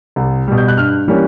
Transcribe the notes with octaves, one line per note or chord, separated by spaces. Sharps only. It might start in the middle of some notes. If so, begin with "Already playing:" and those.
C2
B2 G3
G6
F#6
G2 F6
E3 G3 A#3 C#4